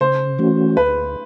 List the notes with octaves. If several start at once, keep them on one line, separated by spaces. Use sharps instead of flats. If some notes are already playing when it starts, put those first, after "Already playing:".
C#3 C5
E3 A3 C#4 F#4
D2 B4